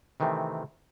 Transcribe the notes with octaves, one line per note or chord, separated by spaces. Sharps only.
C3 D#3 E3 A3 C4